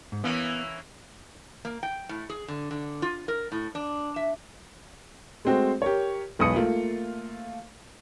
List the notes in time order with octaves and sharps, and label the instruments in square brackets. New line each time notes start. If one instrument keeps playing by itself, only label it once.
[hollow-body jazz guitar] G#2
[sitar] E3 A#3 C#4 [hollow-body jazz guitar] B3
[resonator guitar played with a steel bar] A#3
G5
A2
G#4
D3
D3
F4
A#4
A2
D4
E5
[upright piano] G#3 A3 C4 F#4 C5
G4 A#4 C#5
E1 B1 B4 D#6 C#7
A3 A#3 F4